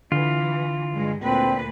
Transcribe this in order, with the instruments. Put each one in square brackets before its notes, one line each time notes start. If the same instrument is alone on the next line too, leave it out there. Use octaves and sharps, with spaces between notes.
[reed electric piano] D3 [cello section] E3 [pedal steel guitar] F4
[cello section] G2 G#3
[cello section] D2 A#2 B4 [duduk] C4